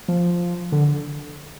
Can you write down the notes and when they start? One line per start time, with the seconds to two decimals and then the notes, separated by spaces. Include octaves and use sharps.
0.08 F3
0.72 D3